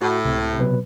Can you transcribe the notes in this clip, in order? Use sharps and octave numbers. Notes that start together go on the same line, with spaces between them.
A2 F#4
C#2 C3
B2 F#3 B4